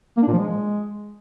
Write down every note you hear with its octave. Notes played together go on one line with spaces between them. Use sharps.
A#3
D4
A#2
F3
G#3